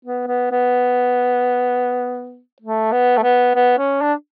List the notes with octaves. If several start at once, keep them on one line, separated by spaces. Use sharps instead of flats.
B3
B3
B3
A3
B3
A3
B3
B3
C#4
D4